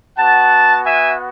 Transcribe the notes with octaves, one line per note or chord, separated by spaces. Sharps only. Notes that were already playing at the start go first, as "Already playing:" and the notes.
B3 F#4 F#5 A5
E5 G#5